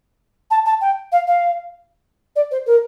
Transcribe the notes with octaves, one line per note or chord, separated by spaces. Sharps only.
A5
A5
G5
F5
F5
D5
C5
A#4